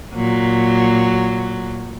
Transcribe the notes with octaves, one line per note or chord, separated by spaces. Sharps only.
A#2 F#3